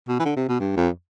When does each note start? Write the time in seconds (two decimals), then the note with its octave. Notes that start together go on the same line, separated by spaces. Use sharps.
0.08 B2
0.20 E3
0.25 D3
0.36 C3
0.48 B2
0.60 G2
0.77 F2